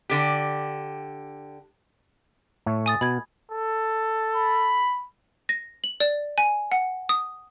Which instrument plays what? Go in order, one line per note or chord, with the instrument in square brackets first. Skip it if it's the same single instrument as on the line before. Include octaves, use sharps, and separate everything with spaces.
[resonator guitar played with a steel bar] D3 G4
[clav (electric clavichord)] A2 A3 C#5
[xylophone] G#5 D#6 A6
[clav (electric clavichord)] B2 [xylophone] B5 G#6
[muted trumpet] A4
[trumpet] B5
[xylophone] A#6
F#7
D5
G#5
F#5
D#6